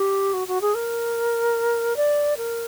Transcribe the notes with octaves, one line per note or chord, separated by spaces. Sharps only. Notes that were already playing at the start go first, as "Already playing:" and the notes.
Already playing: G4
F#4
F#4
G#4
A#4
D5
A#4